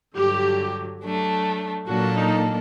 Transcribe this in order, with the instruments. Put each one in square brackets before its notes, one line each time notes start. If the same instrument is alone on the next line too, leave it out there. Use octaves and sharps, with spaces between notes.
[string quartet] G2 D3 F#3 [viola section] G4
[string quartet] F#3 A3 D4
[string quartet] A#2 F#3 A#3 D4 A4 [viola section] F#4
[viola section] D#4